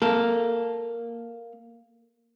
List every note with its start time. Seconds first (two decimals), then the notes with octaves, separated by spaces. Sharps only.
0.02 A#3 A4